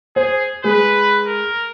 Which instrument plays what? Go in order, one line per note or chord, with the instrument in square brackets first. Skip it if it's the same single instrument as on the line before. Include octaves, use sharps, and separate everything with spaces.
[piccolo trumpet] G#4 [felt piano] C5
[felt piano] G#3 G#4 [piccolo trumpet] B4
[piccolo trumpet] A#4